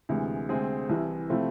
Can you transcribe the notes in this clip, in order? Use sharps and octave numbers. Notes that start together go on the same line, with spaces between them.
D2 C3 E3 G#3
D2 C3 G#3 C4 G#4
C2 C3 E3
C3 F3 A3 C4 E4